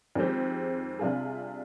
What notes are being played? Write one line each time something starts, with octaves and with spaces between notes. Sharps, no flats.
F2 D#3 G#3 C4 G4
C3 G3 D4 F4 G#4